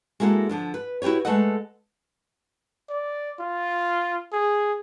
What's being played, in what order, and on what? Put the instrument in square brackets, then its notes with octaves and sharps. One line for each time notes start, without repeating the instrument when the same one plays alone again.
[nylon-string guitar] G#3 A#3 E4 F#4 A4
D3 F3 D4
B4
E4 F#4 G4 B4 C#5
G#3 A3 A4 B4 D#5 F#5
[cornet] D5
F4
G#4